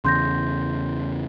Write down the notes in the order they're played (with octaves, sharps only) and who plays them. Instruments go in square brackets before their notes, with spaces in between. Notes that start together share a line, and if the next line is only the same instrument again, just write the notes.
[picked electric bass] E2 C#3 [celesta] C6 G6 A#6